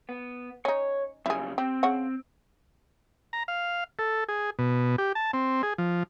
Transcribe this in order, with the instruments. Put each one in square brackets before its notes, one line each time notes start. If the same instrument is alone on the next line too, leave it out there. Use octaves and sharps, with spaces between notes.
[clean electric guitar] B3
[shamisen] C#4 D#4 [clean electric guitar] C#5
[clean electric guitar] F#2 C#3 G3 [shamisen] E4 G#4
[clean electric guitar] C4 [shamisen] G4
[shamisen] C#3 C#5 F#5
[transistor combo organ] A#5
F5
A4
G#4
B2
G4
A5
C4
G#4
F3